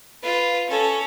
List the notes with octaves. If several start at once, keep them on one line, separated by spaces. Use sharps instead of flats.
F4 B4
C#4 A4